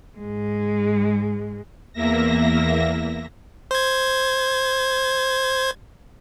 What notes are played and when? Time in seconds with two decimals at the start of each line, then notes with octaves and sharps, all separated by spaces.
0.18 G#2 G#3
1.93 E2 A#3 E5 A#6
3.71 C5 G#6